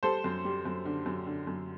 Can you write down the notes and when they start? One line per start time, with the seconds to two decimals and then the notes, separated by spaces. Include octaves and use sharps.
0.03 G3 A4 C5
0.24 F#2
0.45 G3
0.65 F#2
0.85 D3
1.06 F#2
1.27 D3
1.47 F#2